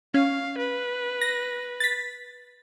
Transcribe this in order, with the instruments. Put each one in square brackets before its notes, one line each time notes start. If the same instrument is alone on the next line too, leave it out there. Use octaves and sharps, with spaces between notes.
[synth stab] C#4 [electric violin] F5
[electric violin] B4
[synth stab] A#6
A6 B6